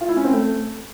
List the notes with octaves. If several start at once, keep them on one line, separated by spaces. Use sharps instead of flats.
F4
E4
C#4
C4
A3